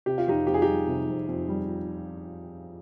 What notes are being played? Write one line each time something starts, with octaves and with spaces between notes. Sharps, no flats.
C3 G4
F4
F2 D#4 G4
F2 G4
G#4
D#4 G4
G3
C3
F2
F2
G3